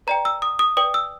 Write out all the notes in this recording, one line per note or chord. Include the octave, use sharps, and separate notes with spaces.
B4 D5 G5 A#5
E6
D#6
D#6
B4 D5 G5 D#6
E6